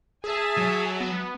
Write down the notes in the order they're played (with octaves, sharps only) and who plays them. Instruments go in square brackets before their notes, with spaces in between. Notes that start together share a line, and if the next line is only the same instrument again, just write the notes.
[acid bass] G#4 [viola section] E5 G#5 A5
[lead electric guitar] F#3
[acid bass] B3